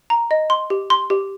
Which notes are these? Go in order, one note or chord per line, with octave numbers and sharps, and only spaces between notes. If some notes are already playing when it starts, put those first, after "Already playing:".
A#5
D#5
C6
G4
C6
G4